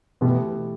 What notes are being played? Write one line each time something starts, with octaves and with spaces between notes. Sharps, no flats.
B2 E3 A3 B3 E4 G4